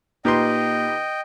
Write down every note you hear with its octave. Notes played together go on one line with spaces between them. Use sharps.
A#2 D#4 G4 B4 D#5 G5 C6